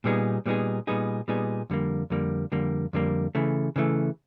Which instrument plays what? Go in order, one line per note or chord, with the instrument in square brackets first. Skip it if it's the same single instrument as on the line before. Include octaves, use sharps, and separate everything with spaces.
[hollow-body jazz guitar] A#2 G3 B3 D#4 G#4
A#2 G3 B3 D#4 G#4
A#2 G3 B3 D#4 G#4
A#2 G3 B3 D#4 G#4
F2 D3 G3 A#3
F2 D3 G3 A#3
F2 D3 G3 A#3
F2 D3 G3 A#3
C#3 E3 A3
C#3 E3 A3